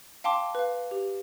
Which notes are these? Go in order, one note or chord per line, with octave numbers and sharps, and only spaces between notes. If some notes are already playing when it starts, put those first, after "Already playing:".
F5 G5 A5 C6 D6
B4 F5
G4